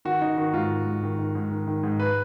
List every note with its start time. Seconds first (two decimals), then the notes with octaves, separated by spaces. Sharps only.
0.05 D#3 F#4
0.21 D#3 D#4
0.37 D#3 F#4
0.53 G#2 F4
0.70 D#3
0.86 G#2
1.03 D#3
1.18 D#3
1.35 G#2
1.51 D#3
1.67 D#3
1.83 G#2
2.00 B4